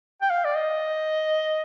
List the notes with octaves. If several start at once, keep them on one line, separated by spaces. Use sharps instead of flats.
G5
F5
D5
D#5